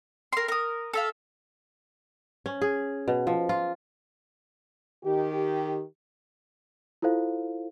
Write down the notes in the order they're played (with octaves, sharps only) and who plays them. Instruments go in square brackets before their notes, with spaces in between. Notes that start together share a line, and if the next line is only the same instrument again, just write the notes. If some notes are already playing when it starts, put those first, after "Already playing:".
[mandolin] A#4 C6
A#4 D#6
A4 E5 F5
[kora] C#4
G#4
B2
F3
F4
[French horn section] D#3 G4
[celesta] E4 F4 A4 C5 F5